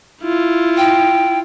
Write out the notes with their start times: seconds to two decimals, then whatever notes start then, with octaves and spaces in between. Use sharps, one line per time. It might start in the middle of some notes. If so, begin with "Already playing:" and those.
0.23 E4 F4
0.77 G5